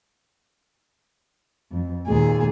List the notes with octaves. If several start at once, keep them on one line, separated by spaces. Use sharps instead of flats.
F2
D#2 A#2 G#4